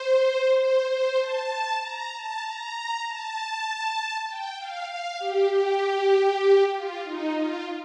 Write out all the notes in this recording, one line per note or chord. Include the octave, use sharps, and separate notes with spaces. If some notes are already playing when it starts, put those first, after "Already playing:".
Already playing: C5
C5
C5
A5
A#5
A5
A#5
A5
G5
F5
F5
G4
G4
F4
D#4
F4